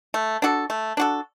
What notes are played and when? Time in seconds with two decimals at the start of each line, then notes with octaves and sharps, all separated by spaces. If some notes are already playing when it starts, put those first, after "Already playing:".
0.14 A3
0.42 D4 F#4 A4
0.70 A3
0.97 D4 F#4 A4